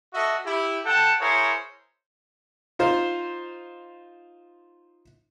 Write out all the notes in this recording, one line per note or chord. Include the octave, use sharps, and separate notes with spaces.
F#4 A4 D#5 E5
E4 G4
A4 F#5 G5 A5
E4 G#4 A#4 C5 C#5
D#4 F4 C5